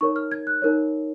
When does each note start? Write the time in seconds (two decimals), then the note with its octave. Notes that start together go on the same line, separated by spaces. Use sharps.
0.01 D#4 A#4 C#5 C#6
0.16 F6
0.31 G#6
0.47 F#6
0.62 D#4 A#4 C#5